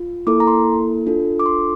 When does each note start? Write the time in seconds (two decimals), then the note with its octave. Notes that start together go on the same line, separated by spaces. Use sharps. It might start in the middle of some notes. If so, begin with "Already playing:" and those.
Already playing: F4
0.27 A#3 E4 A4 D6
0.40 A#5
0.47 C6
1.06 D4 F4 A4
1.39 D6
1.46 C6